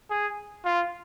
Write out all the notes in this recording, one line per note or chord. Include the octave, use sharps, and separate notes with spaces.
G#4
F4